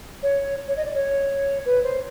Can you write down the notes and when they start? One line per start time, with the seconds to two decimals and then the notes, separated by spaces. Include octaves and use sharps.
0.23 C#5
0.68 C#5
0.76 D#5
0.85 D5
0.94 C#5
1.65 B4
1.83 C5